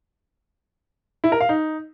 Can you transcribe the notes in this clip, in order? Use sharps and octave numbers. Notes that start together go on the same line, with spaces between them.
E4
A#4
F5
D#4